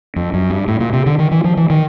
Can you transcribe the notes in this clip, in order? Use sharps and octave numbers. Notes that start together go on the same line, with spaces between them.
F2
F#2
G2
A2
A#2
C3
D3
D#3
E3
F3
E3
D#3